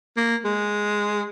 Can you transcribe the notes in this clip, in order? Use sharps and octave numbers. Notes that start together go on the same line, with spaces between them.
A#3
G#3